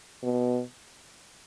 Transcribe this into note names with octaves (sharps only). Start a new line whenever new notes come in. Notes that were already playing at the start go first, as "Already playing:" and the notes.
B2